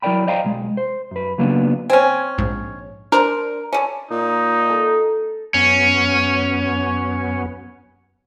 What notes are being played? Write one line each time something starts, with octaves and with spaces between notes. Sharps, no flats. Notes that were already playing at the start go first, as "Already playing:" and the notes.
F#3 E4 A#4 D5 G5 B5
C5 D5 D#5 F5 G5 A#5
B1 G#3
C5
F#2 B4
C#3 F#3 A#3 B3 D4
C4 C#4 G#5
A#1 G#2
D4 A#4 C5
D3 C#4
A#2 D#4
A4
F#2 B3 C#4